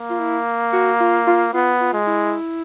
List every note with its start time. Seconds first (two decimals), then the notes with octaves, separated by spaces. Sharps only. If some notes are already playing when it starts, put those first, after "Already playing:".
Already playing: A#3
0.10 F4
0.19 E4
0.73 F#4
1.00 F4
1.27 F4
1.54 B3 F4
1.81 F4
1.94 G#3
2.07 E4